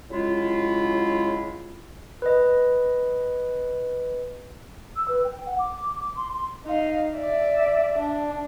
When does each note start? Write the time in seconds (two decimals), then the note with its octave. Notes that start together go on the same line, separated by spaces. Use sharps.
0.10 C#3 F#3 G#3 E4 F4
2.22 B4 D#5
4.95 E6
5.07 B4
5.23 G5
5.46 F#5
5.58 D6
5.99 D6
6.16 C6
6.32 C6
6.66 D#4 F5
7.15 D5 E5
7.98 D4